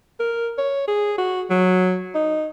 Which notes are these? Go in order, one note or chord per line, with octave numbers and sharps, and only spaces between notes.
A#4
C#5
G#4
F#4
F#3
D#4